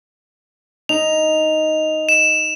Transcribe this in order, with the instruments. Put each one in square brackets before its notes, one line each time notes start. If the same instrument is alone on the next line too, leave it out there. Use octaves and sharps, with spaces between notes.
[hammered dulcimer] D#4 [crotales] F7
[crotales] E7